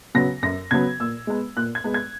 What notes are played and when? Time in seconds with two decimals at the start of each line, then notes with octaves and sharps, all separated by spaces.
0.15 C#3 F#3 B3 A#6
0.42 F#2 A#6
0.71 C#3 F#3 B3 G#6
1.00 A#2 E6
1.27 G#3 B3
1.57 A#2 F#6
1.75 G#6
1.84 G#3 B3
1.94 G#6